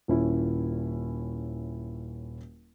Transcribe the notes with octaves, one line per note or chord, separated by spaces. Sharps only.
D#1 C#4 E4